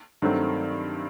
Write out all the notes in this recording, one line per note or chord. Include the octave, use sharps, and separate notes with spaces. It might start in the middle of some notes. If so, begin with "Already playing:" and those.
G2 D#3 F#3 A3 C4